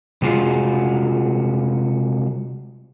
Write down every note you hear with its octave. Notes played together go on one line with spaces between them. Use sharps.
C3 G3 G#3 F4 F#4